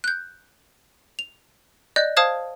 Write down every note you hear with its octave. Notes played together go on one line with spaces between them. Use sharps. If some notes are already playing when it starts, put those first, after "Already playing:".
F#6 G6
F7
D5 D#5 F#6 G6
C5 F5 A5 D#6 F6 G#6